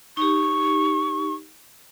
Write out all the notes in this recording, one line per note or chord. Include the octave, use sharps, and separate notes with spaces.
D#4 G4 C#6